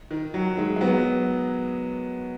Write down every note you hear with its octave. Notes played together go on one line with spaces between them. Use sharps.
D#3
F#3
D#3 G#3
G#3
F#3 B3